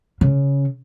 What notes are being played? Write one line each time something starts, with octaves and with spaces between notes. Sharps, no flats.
C#3